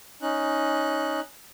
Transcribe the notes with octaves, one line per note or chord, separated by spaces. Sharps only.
C#4 D#4 F#6